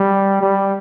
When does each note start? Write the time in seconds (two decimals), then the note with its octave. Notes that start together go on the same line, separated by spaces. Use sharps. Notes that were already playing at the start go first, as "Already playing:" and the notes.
Already playing: G3
0.41 G3